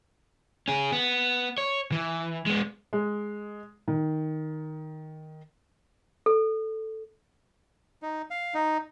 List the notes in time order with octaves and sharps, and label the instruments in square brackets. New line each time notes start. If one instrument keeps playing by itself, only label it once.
[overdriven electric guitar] C#4 G#4
B3
C#5
E3
G#3 B3
[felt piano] G#3
D#3
[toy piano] A4
[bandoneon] D#4
F5
D#4